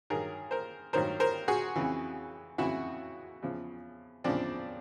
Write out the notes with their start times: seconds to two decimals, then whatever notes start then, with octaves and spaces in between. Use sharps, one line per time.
0.10 G2 D#3 F#3 G#4 A#4
0.51 A#4 C5
0.93 G2 D#3 F#3 A#4 C5
1.20 A#4 C5
1.48 F#4 G#4
1.76 F2 C#3 E3
2.58 F2 C#3 E3 E4 F#4
3.42 E2 C#3 F3
4.24 E2 C#3 F3 C4 D4